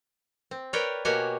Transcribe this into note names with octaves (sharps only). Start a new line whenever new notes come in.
C4
A#4 B4 C#5 D5 G5
B2 A#3 F#4 G4 C#5 G#5